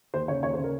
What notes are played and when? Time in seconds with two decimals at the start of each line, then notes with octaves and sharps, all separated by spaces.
0.14 D#2 C5
0.28 C#3 C#5
0.43 D#2 C#5
0.54 C5
0.59 C#3 A#4